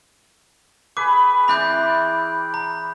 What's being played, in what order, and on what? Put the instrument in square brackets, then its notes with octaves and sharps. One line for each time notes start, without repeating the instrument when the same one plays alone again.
[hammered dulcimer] G#4 B4 B5 [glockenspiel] D6
[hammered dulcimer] E3 C4 D5 [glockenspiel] B5 F#6 G6
[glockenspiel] A#5